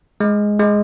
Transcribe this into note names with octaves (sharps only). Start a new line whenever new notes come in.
G#3
G#3